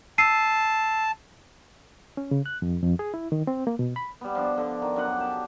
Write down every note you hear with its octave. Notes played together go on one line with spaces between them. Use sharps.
A5 E6 C7 D#7
C#4
C#3
F#6
F2
F2
G#4
E4
D#3
C4
A#3
B2
B5
G3 B3
F3 D4
D3 A4
D#3
F#2 D4 D#5 F#5
G4 A5